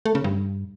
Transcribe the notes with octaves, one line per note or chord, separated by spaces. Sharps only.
A3
C#3
G2